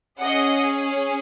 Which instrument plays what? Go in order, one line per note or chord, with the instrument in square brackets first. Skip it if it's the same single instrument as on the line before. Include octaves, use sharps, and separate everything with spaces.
[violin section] C#4 G#4 D#5 F#5